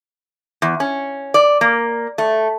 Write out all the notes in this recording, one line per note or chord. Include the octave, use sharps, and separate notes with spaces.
E2
C#4
D5
A#3
A3